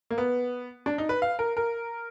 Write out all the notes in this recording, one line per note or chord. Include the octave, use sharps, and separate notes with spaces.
A#3
B3
D4
D#4
B4
F5
A#4
A#4